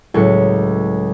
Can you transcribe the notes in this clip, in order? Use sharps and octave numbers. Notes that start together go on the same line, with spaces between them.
C#2 A2 F#3 C#7